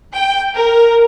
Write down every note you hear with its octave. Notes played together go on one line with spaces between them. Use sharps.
G5
A#4